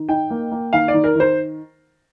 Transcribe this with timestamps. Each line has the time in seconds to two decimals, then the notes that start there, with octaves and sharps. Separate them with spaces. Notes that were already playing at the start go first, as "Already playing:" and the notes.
Already playing: D#3
0.09 D#4 G5
0.30 A#3
0.51 A#3
0.73 D#3 F5
0.88 D5
0.94 D#3
1.04 A#4
1.15 D#3 C5